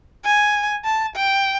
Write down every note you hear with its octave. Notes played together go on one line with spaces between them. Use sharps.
G#5
A5
G5